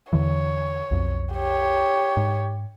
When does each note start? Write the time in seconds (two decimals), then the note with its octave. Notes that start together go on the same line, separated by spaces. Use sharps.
0.13 E2 D3 E3 C#5
0.91 B1 F2
1.34 G4 C#5
2.17 G#2